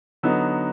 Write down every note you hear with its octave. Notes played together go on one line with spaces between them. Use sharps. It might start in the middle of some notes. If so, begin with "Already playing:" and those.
D3 F#3 B3 D#4